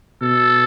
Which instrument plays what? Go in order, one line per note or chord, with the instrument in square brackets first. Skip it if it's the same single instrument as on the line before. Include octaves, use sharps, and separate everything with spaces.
[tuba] B2 [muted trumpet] A4